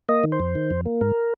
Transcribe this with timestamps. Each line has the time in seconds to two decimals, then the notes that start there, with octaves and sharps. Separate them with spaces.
0.09 A#3 D#5
0.24 D#3
0.32 C5
0.40 F2
0.55 D#3
0.71 F2
0.86 A#3
1.01 G#2 A#4